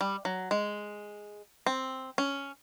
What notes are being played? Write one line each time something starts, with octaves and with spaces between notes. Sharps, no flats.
G3
F#3
G#3
C4
C#4